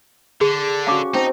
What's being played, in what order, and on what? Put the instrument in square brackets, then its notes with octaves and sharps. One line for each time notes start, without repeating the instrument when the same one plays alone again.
[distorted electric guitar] D3 [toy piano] G#4
[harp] C#4 F#4 [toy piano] F5 A5 D6
[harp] C4 [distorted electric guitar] D#4 [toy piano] G5 A5